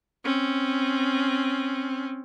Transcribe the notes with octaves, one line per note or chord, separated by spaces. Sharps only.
C4 C#4